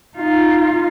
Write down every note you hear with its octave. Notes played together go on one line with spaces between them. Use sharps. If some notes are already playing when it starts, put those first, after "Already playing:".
D#4 F4